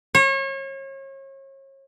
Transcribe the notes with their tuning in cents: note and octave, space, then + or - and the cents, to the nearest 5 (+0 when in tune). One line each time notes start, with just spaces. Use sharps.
C#5 -35